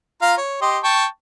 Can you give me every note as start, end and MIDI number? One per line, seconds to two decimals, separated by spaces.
0.22 0.35 65
0.22 0.35 77
0.22 0.35 82
0.37 0.57 73
0.62 0.78 67
0.62 0.78 75
0.62 0.78 84
0.84 1.06 79
0.84 1.06 81
0.84 1.06 85